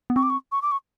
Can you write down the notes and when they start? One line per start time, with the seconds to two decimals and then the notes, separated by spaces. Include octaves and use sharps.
0.10 B3
0.16 C4 C#6
0.23 D6
0.30 C#6
0.52 C#6
0.62 D6
0.71 C#6